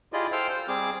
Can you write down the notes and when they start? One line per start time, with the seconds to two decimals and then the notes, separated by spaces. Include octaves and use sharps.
0.13 E4 F4 G4 G#4 D5 D#5
0.32 A4 C5 F5 G5 C6 F6
0.49 C5
0.68 G3 C4 G#4 D6